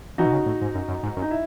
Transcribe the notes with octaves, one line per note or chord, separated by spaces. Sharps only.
E3 D#4 F#4
B2
C#3
A2
G#2
F#2
F#2
G#2
F#2
D#4
E4